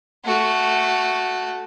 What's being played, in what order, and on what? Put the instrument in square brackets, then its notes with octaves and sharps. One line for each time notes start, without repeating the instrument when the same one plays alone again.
[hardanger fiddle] A3 F#4